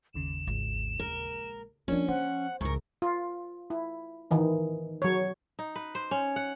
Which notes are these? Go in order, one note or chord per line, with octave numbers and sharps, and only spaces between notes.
G1 D#2 C#3 E7
G#1 F4
A#1 G#3 A#4
F3 A#3 C#4 D4 E4 F4
F3 C5 F#5
C#2 G#2 E3 A#4 C#6
F4
E4
D#3 E3 D#4
F#3 C#5
D#4
B4
C5
C#4
F#5